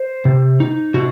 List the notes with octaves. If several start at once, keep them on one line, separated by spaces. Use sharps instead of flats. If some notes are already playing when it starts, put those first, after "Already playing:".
Already playing: C5
C3
D#4
C3 F#4